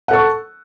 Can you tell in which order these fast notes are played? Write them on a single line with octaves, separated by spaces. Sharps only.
F#5 A4 C#6